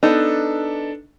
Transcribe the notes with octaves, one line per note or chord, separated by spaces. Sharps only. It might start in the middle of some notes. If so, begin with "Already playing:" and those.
B3 D4 D#4 A4